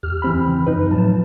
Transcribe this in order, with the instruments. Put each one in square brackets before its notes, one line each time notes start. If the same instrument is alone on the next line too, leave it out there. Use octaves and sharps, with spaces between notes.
[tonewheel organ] E2 G4 F6
[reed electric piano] E3 C4 B5
[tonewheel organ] C#3
[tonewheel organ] F#2 F3 [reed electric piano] D#4 B4
[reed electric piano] A2 F3 F#3 [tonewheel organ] A5